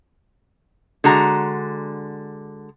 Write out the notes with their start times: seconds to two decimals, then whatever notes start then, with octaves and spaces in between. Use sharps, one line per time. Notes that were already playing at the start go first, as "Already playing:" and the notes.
1.04 D3 G#3 F#4 A#5